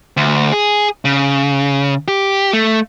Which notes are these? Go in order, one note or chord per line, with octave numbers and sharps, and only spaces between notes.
D2
G#4
C#3
G4
A3